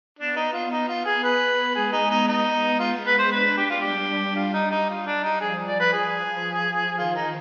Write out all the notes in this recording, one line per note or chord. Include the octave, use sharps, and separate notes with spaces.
B3 D4
D#4
F4
D#4
F4
G#4
B4
G#3 G#4
D#4
D#4
B3 D#4
G#3 F4
B4
C5
D4 B4
G4
F4
G3 G4
G3 F4
D#4
D#4
F4
D4
D#4
F3 G#4
D5
B4
G#4
D#3 F4
D#4